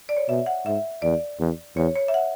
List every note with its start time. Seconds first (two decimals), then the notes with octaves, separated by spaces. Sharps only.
0.09 D5
0.16 C#5
0.29 B2 E5
0.46 F#5
0.65 G#2 E5
1.02 E2 D5
1.39 E2
1.76 E2 C#5
1.96 C#5
2.08 E5
2.14 F#5